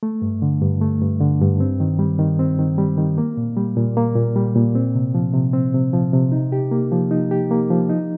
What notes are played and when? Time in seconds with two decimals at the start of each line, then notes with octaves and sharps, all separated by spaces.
0.03 A3
0.22 G2
0.42 D3
0.61 G2
0.81 A3
1.01 G2
1.21 D3
1.41 G2
1.60 C4
1.80 D#3
1.99 G3
2.19 D#3
2.39 C4
2.59 D#3
2.78 G3
2.97 D#3
3.18 A#3
3.37 A#2
3.57 G3
3.77 A#2
3.97 A#3
4.16 A#2
4.36 G3
4.56 A#2
4.75 C4
4.95 C3
5.15 F3
5.34 C3
5.53 C4
5.74 C3
5.93 F3
6.13 C3
6.32 D#4
6.52 G4
6.71 A#3
6.92 F3
7.11 D#4
7.31 G4
7.51 A#3
7.70 F3
7.89 D#4